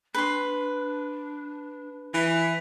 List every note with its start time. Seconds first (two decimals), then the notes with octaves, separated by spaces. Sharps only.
0.14 D4 B4 C6
2.14 E3 E5